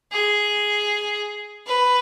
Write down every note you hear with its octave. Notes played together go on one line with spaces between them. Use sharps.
G#4
B4